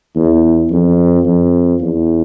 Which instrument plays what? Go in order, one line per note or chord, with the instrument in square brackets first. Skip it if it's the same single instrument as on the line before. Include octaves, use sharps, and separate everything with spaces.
[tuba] E2
F2
F2
E2